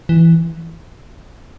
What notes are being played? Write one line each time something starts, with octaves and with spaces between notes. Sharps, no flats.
E3